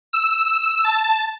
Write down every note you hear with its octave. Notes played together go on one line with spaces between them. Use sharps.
E6
A5